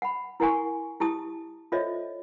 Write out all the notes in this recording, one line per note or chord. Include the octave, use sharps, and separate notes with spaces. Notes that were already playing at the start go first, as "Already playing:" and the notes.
F#5 B5
E4 A#4 F#5 G#5 C6 C#6
E4 G4 A5 D#6
F4 A4 C5 C#5 D#5 E5